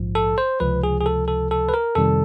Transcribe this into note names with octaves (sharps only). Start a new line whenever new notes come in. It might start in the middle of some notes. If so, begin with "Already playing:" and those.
Already playing: A#1 G#2 F3
A4
C5
C#2 C3 F3 B4
G#4
G#4
A4
A4
A4
B4
A#4
F2 C3 D#3 G3 A4